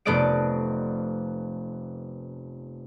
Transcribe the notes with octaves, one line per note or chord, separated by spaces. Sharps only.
F1 A3 B3 D5 D#5 D7